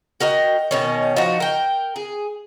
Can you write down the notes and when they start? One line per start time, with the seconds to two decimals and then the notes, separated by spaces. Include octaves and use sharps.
0.21 F#4 A#4 D#5 G5
0.71 B2 D#3 C#4
1.16 F3 D#4 F#4
1.40 A#4 G5
1.96 G#4